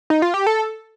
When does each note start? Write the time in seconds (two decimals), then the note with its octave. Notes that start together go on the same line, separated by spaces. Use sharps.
0.10 D#4
0.22 F4
0.34 G4
0.47 A4